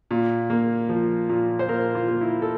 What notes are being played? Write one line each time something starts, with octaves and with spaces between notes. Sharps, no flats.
A#2
A#3
F3
A#2
C5
A#2 A#4
F4
A#3
E4
A4